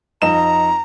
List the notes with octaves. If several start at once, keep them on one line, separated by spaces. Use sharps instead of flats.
F2 D#4 A#5 E7